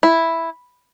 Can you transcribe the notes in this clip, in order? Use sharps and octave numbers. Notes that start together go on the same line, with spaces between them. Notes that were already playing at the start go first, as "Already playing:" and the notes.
E4